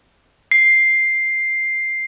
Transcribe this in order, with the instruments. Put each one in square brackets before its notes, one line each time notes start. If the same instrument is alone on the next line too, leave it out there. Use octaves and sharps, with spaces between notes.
[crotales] C7